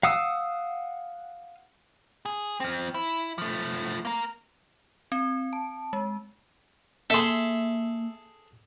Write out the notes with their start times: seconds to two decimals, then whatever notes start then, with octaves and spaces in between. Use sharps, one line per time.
0.03 F5 F#5 D#6 E6
2.26 G#4
2.60 F3 C4
2.94 E4
3.38 F3 A3
4.05 A#3 A#4
5.12 C4
5.53 A5
5.93 G#3
7.10 A#3 G#4 A4 E5 C6